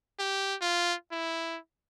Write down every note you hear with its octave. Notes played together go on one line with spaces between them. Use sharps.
G4
F4
E4